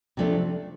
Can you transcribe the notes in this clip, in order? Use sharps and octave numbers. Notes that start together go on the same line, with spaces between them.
C3 F3 A3 D4